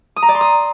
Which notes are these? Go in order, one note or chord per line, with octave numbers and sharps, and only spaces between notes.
D#6
A#5
D5
C6
D#6